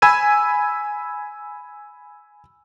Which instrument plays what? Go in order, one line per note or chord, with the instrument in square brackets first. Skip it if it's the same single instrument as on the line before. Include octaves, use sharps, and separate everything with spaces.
[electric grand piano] G#5 B5 E6 G#6 D#7